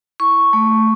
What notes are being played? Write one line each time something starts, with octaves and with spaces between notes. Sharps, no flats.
E4 C#6
A3